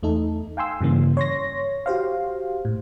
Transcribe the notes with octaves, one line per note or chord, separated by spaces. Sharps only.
E2 A3 D#4 A4
F5 G5 G#5 C6 E6
G2 C#3 E3 A#3
C#5 C6 A#6
F#4 G4 C5 F5
A2